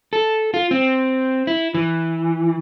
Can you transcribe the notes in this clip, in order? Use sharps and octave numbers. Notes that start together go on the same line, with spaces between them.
A4
F4
C4
E4
E3